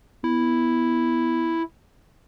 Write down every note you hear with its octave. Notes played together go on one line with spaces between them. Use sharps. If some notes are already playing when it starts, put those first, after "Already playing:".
B3 E4